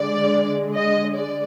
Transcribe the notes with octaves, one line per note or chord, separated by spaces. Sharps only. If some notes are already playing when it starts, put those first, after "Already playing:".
Already playing: D3 G#3 D5
D#5
D5